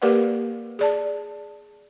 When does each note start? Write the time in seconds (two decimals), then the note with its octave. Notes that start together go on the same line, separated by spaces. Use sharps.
0.02 A#3 G4 A#4 B4 D5 F#5
0.79 G#4 D5 A5